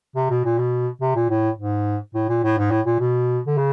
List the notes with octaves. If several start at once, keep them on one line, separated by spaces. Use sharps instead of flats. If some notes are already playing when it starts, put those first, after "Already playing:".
C3
B2
A#2
B2
C3
A#2
A2
G#2
A2
A#2
A2
G#2
A2
A#2
B2
D3
C#3